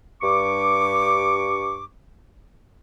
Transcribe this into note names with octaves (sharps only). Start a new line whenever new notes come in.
G2 C#6 D6